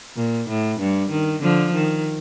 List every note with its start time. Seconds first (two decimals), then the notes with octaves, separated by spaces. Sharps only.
0.17 A#2
0.49 A2
0.80 G2
1.11 D#3
1.42 D3 F3
1.74 D#3